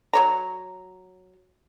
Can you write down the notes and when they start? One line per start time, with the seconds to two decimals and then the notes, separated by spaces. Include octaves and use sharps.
0.13 F#3 C#5 A#5